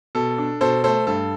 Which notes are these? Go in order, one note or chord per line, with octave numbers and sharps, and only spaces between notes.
B2 A4
D4
B2 A4 C5
A3 A4 C5
G2 A4